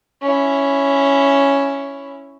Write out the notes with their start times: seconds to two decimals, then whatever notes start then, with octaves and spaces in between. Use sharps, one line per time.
0.22 C#4 E4